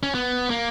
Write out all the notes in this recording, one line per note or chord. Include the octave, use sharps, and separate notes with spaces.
C#4
B3
A#3